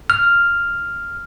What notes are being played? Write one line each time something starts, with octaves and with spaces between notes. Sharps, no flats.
F6